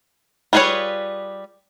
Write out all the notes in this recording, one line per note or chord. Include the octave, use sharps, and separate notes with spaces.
G3 F4 G#4 B4 C#5